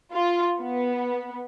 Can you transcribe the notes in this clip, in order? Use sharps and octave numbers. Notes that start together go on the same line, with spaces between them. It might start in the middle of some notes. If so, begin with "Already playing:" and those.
F4
B3